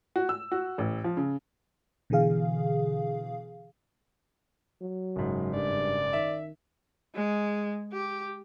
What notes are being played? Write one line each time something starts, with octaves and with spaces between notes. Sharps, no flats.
F#4
E6
F#4
A1
F3
C#3
B2 D3 E3 G#4 F5
F#3
F#1 G#2
G2 D5
D#3 E5
G#3
G4